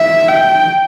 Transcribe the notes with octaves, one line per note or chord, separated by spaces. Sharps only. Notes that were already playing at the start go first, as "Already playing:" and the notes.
Already playing: E5
G5